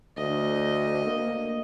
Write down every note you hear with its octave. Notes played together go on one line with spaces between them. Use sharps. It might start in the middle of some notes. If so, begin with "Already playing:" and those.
D2 D#5
A#3